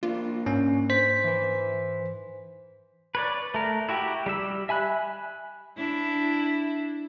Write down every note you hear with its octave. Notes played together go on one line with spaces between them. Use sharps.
A#3 D4 F4
G#2 C#4
C5 B6
E3 B4
B4 C#5 D5
A3 A#4
E4 F#4 G4
G3 G4 E6
E5 G#5 B5 F#6
D4 E4